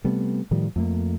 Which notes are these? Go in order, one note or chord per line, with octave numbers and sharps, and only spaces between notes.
C3 G3 A3 B3
A2 D#3 F3 G3
F2 A3 A#3